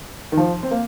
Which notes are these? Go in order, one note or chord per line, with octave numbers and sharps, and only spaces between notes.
D#3
F3
C4
A#3